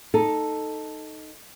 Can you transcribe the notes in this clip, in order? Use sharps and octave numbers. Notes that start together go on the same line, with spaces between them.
D#4 A4